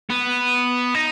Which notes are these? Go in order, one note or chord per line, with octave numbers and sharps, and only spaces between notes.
B3
D#4